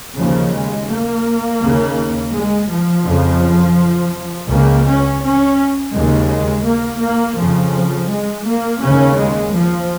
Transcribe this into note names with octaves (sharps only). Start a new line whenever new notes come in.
D#2 C#3 F3
G#3
A#3
D#2 C#3
G#3
F3
F2 C#3
C#2 C#3 A#3
C#4
C#4
D#2 C#3 G#3
G#3
A#3
A#3
F2 C#3 F3
G#3
A#3
D#2 C#3 C#4
G#3
F3